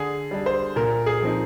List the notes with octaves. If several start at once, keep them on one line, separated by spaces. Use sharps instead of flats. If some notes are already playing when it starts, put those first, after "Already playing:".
Already playing: D3 G#4
G3 D4
C5
A#2 A#4
G#4
F3 C4 D#4